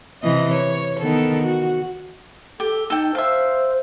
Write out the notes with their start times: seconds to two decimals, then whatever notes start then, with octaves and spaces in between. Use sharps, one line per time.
0.23 C3 E3 D#5
0.52 C#5
0.99 D#3 B3 A4
1.42 F#4
2.60 G4 A4
2.90 D#4 A4 G5
3.15 C5 E5 F5